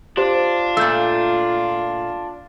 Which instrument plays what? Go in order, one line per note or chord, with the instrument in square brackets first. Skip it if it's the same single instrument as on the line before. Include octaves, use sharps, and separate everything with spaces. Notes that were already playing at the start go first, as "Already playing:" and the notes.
[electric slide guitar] D4 [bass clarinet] F4 [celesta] G4 C5
[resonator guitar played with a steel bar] A#2 A3 [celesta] E6 G6